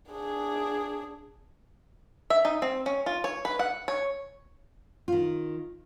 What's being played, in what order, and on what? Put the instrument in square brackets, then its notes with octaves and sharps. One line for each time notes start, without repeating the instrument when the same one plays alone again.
[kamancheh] D4 G#4
[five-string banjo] E5
D#4
C4
C#4
F4
C#5
B4
F#5
C#5
[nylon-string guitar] D#3 F4